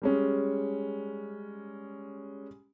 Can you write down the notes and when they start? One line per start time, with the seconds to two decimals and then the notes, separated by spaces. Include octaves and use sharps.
0.02 G3 G#3 C#4